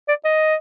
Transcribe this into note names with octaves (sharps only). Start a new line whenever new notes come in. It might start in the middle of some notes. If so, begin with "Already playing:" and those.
D5
D#5